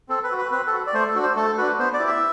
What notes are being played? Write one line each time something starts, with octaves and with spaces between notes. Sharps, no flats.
C4 A4
B4
F#4
B4
C4 B4
A4
F#4
D5
A3 C5
A4
D4 F#4
C5
A3 A4
D4 F#4 B4
B3 C5
D5
E4 G4
E5